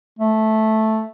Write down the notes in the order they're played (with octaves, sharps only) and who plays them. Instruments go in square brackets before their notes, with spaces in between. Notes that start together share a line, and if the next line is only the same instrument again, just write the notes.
[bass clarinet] A3